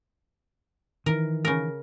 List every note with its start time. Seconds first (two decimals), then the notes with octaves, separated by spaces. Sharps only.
1.06 D#3 E3 A#4
1.45 C#3 A#4